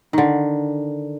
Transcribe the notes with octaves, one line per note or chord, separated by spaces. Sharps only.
D3 D#3